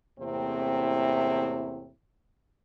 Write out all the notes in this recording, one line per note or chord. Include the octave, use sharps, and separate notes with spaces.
E2 A2 C3 A#3 C4 E4